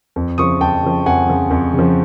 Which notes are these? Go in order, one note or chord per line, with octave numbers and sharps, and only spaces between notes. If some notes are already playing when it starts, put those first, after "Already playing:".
F2
C#3 F3 C#6 D#6
F2 G5 A5
C#3 F3
F2 F#5 G#5
C#3 F3
F2
C#3
F3